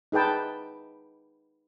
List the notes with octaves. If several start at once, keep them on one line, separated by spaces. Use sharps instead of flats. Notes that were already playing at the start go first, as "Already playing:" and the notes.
D#4 G#4 B4 G5 A5